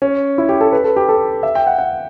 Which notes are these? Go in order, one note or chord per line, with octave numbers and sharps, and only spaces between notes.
C#4
E4
G4
A4
B4
A4
G4
A4
E5
G5
F#5
F#5